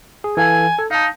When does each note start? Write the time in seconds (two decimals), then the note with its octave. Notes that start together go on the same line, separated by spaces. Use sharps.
0.24 G#4
0.37 E3 A4 F5 G#5
0.79 A4
0.91 D#4 F5 A5